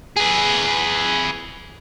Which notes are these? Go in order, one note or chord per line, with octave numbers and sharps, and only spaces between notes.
G#4 B4